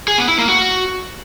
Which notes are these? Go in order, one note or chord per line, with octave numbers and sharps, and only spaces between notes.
G#4
B3
E4
A#3
F#4